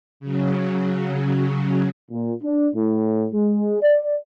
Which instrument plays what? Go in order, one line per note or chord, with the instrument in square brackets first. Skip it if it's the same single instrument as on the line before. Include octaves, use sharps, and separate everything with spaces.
[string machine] C#3 F#3
[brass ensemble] A#2
D4
A2
G#3
D5